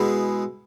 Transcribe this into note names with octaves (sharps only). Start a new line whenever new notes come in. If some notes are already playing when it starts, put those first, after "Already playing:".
Already playing: B2 G#3 B3 E4 G#4